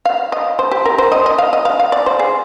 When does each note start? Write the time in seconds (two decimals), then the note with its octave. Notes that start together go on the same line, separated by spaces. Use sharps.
0.05 F5
0.32 D#5
0.59 C5
0.71 G4
0.86 A#4
0.98 C5
1.12 D#5
1.26 D#5
1.38 F5
1.53 D#5
1.65 F5
1.79 F5
1.92 D5
2.06 C5
2.19 G#4